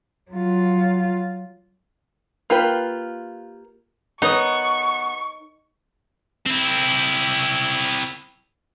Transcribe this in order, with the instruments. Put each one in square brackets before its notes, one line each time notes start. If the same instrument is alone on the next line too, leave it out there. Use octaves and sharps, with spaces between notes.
[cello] F#3 F4
[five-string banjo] A#3 F4 G4 B4
[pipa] B3 [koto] D#4 [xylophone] A#4 C#5 D#6 [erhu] C#6
[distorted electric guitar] C4 E4